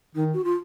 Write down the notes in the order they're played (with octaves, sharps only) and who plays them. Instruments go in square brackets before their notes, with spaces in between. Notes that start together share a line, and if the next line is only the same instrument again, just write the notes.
[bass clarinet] D#3 [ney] D#4
[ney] F#4
F4